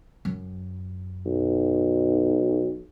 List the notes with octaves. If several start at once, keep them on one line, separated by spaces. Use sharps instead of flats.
F#2
B1